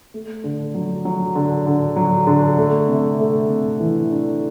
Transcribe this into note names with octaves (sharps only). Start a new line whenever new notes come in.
A3
D3
F#3
F#3
D3
D3
F#3
D3
A3
C3
A3
C3
E3
D4